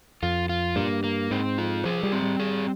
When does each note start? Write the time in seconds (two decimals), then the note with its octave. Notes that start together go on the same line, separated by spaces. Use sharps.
0.23 F2 F4
0.49 F4
0.76 G2 A#3
1.04 A#3
1.31 G#2 C4
1.58 F4
1.85 F3 G#4
2.03 G3
2.12 C4
2.22 G3
2.40 G#4